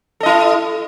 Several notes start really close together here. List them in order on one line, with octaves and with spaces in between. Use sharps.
A4 D#5 E4